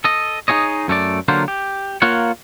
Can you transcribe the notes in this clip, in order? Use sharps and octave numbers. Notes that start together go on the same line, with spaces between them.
A4 D#5
D#4 F4 G#4 C#5 D#5
F#2 A3 F#4 D5
D3 F#3 A#3 D4 F4 C5
G4
A#3 F4 A#4 C#5 F#5